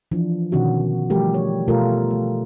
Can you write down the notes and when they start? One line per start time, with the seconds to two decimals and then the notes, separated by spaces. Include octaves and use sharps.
0.11 E3 F3 D4
0.52 B2 D3 D#3 C#4 F#4
1.10 E3 F3 G3 A3 G4 A#4
1.34 C#5
1.68 B2 A3 F4 G4 A4 A#4
2.11 A3